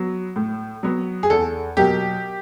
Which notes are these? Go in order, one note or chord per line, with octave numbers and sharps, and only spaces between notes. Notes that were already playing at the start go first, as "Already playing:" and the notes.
Already playing: F#3 B3
A2
F#3 B3
G#4
E2 A4
B2 F#3 A#3 G4